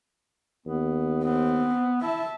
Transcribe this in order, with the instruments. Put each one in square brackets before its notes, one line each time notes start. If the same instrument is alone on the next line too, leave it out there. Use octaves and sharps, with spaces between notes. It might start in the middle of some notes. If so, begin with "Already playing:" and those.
[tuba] D#2 [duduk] B3
[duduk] B3 [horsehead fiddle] C4
[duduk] E4 [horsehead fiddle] E5 A5